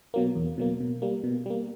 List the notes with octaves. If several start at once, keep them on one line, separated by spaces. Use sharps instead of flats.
B2 F#3 A#3
E2
B2 F#3 A#3
B2
G3 A#3
B2
G3 A#3